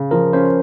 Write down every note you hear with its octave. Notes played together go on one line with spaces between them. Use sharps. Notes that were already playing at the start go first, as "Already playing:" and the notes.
Already playing: C#3
F3 A#4
C#4 C5